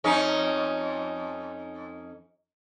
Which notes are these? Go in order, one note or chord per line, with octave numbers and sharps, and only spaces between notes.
F2 C#4 D#4